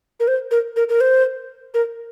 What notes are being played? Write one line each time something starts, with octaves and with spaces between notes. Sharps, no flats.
A#4
C5
A#4
A#4
A#4
C5
A#4